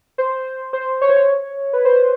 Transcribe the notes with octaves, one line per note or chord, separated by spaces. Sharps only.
C5
C5
C#5
C5
C#5
B4
C5